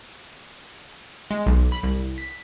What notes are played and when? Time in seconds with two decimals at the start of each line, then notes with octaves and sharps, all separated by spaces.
1.31 G#3
1.46 B1
1.72 B5
1.83 C2
2.18 B6